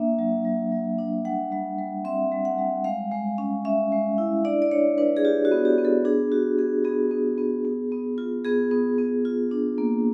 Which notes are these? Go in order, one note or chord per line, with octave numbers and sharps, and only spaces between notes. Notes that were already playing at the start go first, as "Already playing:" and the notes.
Already playing: A#3 D4 E5
F#3
F#3
F#3
D4
G3 F#5
G3
G3
C4 E5
G3
F#5
G3
G#3 F5
G#3
C#4
C#4 E5
G#3
E4
D4 D5
D5
D4 C#5
D4 B4
G#4
F4 G4
F#4
B3
G4
B3
A4
D4 G#4
F#4 G4
B3 G#4
B3 G#4
B3
B3
B3
B3
F4
B3 G#4
B3
B3
F4
D4
A#3